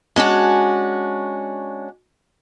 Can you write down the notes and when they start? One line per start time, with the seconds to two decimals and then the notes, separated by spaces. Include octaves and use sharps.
0.16 G#3 C#4 D4 F#4